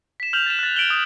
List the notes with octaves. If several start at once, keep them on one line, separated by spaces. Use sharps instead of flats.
B6 E7
F6 G6 F7 F#7
A6 E7
F#6 A6
A6 D7 E7 F#7 G7
D#6